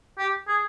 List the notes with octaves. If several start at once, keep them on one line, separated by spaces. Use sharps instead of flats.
G4
G#4